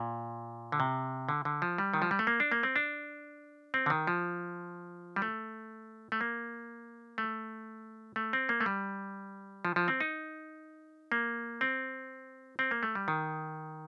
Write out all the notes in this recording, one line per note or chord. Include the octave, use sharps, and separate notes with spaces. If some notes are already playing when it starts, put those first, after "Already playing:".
Already playing: A#2
D3
C3
D3
D3
F3
G3
D#3
F3
G3
A3
A#3
D4
A#3
C4
D4
C4
D3
D#3
F3
G3
A3
A3
A#3
A3
A3
C4
A#3
A3
G3
F3
F3
C4
D#4
A#3
C4
C4
A#3
A3
G3
D#3